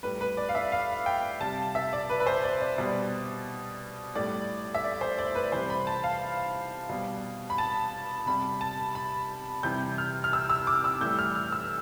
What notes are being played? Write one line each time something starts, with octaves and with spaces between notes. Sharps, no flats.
A2 G3 B4
B4
D5
F5
E5
F5
G5
C3 G3 A5
E5
D5
B4
B4
C5
D5
D5
B2 G3
A2 G3 D5
E5
D5
C5
D5
B4
C3 E3 G3 C5
B5
A5
F5
B2 G3
B5
A5
C3 G3 B5
A5
B5
C3 E3 G3 G6
F6
F6
E6
E6
D6
E6
A2 E3 G3 G6
F6
F6
E6